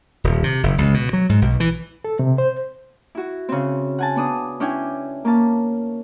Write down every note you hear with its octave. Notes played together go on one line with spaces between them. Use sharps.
D#1
C3
F#1
C#2
B2
F#3
G#2
B1
E3
A4
C3
C5
E4 F#4
C#3 C4
F#5 G#5 A5
B3 D4 D#6
C#4 D4 E4 G5 G#5
A#3 C#4 A5